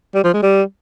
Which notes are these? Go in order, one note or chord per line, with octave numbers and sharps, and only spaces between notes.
G3
F3
G#3
G3